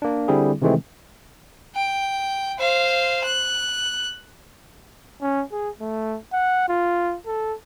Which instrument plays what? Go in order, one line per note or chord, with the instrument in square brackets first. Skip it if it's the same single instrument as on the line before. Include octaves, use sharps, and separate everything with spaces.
[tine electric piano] A#3 D4
D3 G3 C4 E4 G#4
C3 D#3 E3 G#3 A3 C4
[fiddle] G5
C5 F5
F#6
[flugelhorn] C#4
G#4
A3
F#5
F4
A4